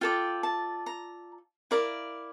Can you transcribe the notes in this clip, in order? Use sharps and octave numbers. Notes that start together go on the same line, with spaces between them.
F4 A4 D5 G5
A5
A#5
E4 A#4 D5 F5